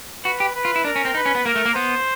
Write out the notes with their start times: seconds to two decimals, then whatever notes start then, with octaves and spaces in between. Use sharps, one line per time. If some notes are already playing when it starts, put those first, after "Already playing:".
0.25 F#4 B4
0.40 G4
0.55 B4
0.65 F4
0.76 E4
0.84 D4 A#4
0.96 C#4
1.05 C4
1.15 D#4 B4
1.26 C#4
1.35 B3
1.45 A#3 A#4
1.56 A3
1.66 A#3
1.75 B3 C5